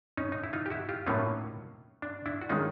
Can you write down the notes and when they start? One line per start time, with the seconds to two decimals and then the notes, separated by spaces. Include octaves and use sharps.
0.17 C#4 D#4
0.32 D#4
0.44 E4
0.53 D#4 F4
0.66 G4
0.70 E4 F#4
0.89 F4 G4
1.06 A2 F#3 A#3 C#4 D#4 F4
2.02 D4
2.26 D4 E4
2.41 F#4
2.49 D#3 G#3 C#4 D#4 F4